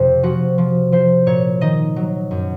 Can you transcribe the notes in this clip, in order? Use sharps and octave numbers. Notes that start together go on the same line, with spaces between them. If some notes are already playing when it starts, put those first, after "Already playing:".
Already playing: F2 C3 C5
F3 F#4
F3
F3 C5
A#2 C#5
D#3 D#5
F#3
F#2